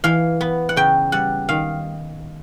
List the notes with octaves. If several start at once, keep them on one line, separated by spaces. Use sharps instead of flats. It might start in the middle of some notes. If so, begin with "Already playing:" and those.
E3 F5
B3
F#5
C#3 G5
G3 F#5
D#3 F5